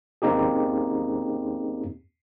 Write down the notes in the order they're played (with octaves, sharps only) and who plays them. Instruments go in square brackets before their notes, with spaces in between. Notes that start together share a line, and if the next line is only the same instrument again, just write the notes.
[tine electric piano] A#3 C4 C#4 D#4 G4 G#4